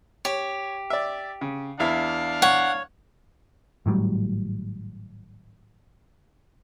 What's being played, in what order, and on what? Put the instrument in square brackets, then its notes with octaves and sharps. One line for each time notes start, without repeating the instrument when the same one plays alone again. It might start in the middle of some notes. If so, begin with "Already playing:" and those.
[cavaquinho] G4 [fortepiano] C#5
[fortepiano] D5 E5
C#3
[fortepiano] E2 E4 [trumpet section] D4 F5
[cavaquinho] C#5 [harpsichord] F#5
[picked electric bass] G#1 A2 F#3 G3